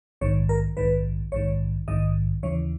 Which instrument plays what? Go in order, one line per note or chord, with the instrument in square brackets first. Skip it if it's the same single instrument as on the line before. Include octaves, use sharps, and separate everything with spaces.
[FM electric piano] A#1 G#2 D#3 C#5
A#4
A#1 G#2 D#3 B4
A#1 G#2 D#3 C#5
A#1 G#2 D#3 D#5
D#2 C#3 E3 C#5